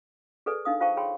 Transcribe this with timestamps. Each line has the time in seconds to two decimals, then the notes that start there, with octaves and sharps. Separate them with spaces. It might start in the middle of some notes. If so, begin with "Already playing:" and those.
0.46 G#4 A4 B4 D5 G#5
0.65 D4 D#4 F5 D#6
0.80 F4 C5 F5 G5 A5 C#6
0.97 G#4 C#5 G5 B5 C6